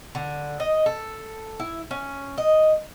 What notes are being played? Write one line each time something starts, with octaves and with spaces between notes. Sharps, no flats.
D3
D#5
A4
E4
C#4
D#5